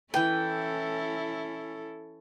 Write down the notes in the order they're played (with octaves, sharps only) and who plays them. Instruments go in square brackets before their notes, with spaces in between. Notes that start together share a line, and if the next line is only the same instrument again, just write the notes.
[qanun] E3 B4 [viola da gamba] C#4 E4 A4 [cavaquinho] G5